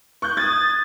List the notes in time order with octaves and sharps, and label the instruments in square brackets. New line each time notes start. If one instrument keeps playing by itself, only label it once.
[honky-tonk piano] C#6 F#6 G6
[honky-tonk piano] D#6 G#6 [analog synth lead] A6